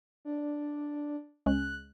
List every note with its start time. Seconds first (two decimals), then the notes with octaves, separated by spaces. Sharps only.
0.25 D4
1.46 C#2 G#3 C#4 F#6